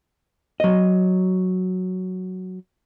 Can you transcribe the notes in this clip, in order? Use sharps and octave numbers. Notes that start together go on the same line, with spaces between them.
F#3 D#5